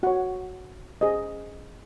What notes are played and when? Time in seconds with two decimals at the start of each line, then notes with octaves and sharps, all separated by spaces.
0.03 F#4 C#5 F#5
1.01 C#4 G#4 C5 D#5